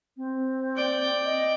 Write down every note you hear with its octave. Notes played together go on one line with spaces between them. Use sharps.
C4
D5 G5
D#5